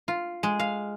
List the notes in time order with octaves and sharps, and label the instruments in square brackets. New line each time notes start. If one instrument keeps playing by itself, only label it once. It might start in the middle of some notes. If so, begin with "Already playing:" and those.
[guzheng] F4
G#3
F5